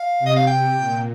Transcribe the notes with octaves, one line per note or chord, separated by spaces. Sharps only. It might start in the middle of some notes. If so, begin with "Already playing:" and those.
Already playing: F5
C3
D#5
F5
C3 G5
A#2